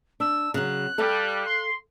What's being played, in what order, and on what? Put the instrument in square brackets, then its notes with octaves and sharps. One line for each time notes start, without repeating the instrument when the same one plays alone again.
[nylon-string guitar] D4 [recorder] E6
[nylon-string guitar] C#3 F#3 [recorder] F#6
[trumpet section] G3 [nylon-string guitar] A4 F5
[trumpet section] C6